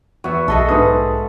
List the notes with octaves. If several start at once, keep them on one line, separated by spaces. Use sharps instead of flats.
E2 F#4 E5
B1 G#4 A4 D#5 E5
G#2 B4 D#6